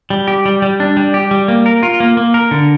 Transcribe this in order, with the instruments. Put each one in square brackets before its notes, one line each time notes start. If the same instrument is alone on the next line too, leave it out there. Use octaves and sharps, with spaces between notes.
[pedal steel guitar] G3
G4
G3
G3
D4
G3
G4
G3
A#3
A#4
F4
A#3
A#3
A#4
D3